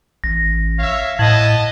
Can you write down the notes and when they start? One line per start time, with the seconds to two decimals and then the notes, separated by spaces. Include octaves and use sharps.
0.24 A1 A#6
0.79 C#5 E5 F5
1.19 A2 B3 D#5 A5 G#6 F#7